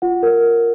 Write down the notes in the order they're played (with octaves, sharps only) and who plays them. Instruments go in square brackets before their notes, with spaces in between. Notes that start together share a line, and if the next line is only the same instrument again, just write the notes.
[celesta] F4 F#5
A#4 C#5